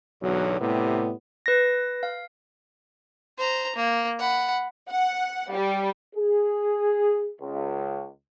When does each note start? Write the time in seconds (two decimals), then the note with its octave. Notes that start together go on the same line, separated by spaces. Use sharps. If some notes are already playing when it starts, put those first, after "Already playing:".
0.23 B1 E2 D3 F#3
0.61 A2 C3 G3 B3
1.46 B4 A#6
2.03 F5
3.38 C5 A#5
3.76 A#3
4.19 F#5 B5
4.91 F#5
5.53 G3
6.16 G#4
7.41 C#2